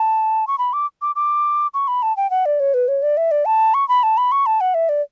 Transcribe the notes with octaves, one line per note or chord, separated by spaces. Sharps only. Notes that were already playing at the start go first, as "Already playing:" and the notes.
Already playing: A5
C#6
B5
D6
D6
D6
C#6
B5
A5
G5
F#5
D5
C#5
B4
C#5
D5
E5
D5
A5
C#6
B5
A5
B5
C#6
A5
F#5
E5
D5